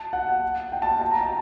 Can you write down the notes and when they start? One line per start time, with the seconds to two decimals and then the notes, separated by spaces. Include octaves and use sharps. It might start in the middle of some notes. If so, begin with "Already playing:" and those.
Already playing: A5
0.13 F#5
0.72 G5
0.82 A5
1.02 A5
1.11 A#5
1.21 A5